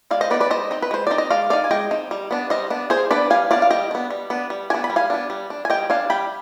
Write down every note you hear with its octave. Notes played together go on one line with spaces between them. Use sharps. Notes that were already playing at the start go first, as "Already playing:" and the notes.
G#3 D5 F5
C5 D#5
B3 D#4 B4 D5
B4 D5
G#3 C5 D#5
C4 D#4
B4
G#3 C5
C4 D#4 D5
D#5
G#3 D5 F5
C4 D#4 D5 F5
G#5
G#3 D#5 G5
C4 D#4
G3
B3 D4
G3 C5 D#5
B3 D4
G3 G#4 C5
B3 D4 B4 D5
G3 F5 G#5
B3 D4 D5 F5
F5
G3 D#5 G5
B3 D4
G3
B3 D4
G3
B3 D4 G#5
B5
G3
F5 G#5
B3 D4
G3
D4
G#5
G3 D#5 G5
D4 F5 G#5
G3 G5 B5